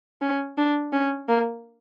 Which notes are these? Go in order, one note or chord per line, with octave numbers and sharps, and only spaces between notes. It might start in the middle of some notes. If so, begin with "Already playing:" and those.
C#4
D4
C#4
A#3